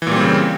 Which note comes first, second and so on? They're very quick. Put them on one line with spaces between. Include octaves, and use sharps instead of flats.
E3 A#2 G3 C4 C#3